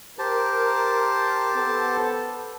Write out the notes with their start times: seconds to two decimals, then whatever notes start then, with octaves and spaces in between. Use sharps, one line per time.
0.19 G4 A#4 C5 A5
1.56 B3 A4